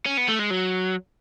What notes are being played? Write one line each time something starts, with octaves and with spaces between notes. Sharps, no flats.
C#4
B3
A3
G#3
F#3